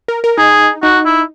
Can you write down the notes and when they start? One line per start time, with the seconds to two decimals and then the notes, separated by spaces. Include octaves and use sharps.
0.08 A#4
0.24 A#4
0.38 D#4 G#4
0.83 D#4 F#4
1.06 E4